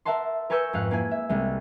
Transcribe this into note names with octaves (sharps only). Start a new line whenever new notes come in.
A#4 E5 F#5 A5 C6
A#4 B4 G#5 C#6 E6 G6
F2 G#2 F5 F#6
A#3 E4 G#5
E5
C2 G#3